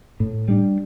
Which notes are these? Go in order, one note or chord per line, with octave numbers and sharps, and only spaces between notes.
A2
G3 D4